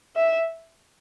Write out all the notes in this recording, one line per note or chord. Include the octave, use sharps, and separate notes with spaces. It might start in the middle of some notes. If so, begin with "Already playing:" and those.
E5